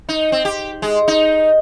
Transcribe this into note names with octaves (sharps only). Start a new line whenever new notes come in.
D#4
C4
G4
G#3
D#4